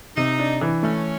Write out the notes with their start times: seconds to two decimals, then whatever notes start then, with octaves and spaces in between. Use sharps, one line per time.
0.17 C3 D#4
0.39 D4
0.61 E3
0.83 A3 C#4